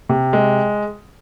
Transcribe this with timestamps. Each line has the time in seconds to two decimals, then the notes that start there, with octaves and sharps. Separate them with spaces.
0.09 C3
0.33 G#3